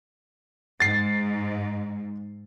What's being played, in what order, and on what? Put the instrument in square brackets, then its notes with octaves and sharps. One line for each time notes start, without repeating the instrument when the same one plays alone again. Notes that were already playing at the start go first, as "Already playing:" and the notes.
[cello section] G#2 [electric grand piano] A6 C7